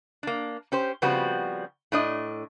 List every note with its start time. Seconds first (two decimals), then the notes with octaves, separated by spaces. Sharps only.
0.23 A#3 D4
0.72 C#4 G4 C5
1.02 C#3 F3 G3 B3 C4 F#4
1.92 A2 D4 D#5